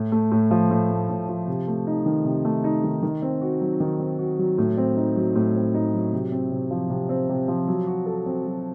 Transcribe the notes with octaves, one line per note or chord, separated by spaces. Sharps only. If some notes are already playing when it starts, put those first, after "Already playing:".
Already playing: A2
A3
A2
F3
A2
A3
A2
F3
C3
A3
D#4
D#3
C3
A3
D#4
D#3
D#3
C4
F#4
F#3
D#3
C4
F#4
F#3
A2
C4
D#4
F#3
A2
C4
D#4
F#3
C3
C4
C3
F3
C3
C4
C3
F3
F#3
F#4
A4
C4
F#3